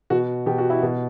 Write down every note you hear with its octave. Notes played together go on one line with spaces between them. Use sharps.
B2 F#4
B2 G4
F#4
E4
B2